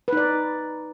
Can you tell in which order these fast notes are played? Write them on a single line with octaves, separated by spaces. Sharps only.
B4 D#4 D5